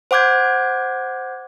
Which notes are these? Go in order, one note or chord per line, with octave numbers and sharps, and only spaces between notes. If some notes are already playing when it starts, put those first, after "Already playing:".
C5 F#5 D6 G6 G#6